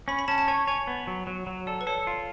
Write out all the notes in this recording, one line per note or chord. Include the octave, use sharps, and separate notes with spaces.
C#4 B5
B5
C#4 A5
A5
C#5 G#5
C#5 G#5
B3
F#3
F#3
F#3
A4 D5
B4
A4 C#5
F4